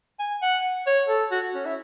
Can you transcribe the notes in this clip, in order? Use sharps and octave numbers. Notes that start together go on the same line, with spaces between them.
G#5
F#5
C#5
A4
F#4
C#4
E4